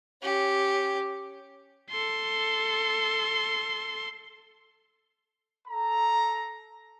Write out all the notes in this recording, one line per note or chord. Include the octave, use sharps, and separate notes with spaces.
C#4 G4
A4 C6
A4 A#5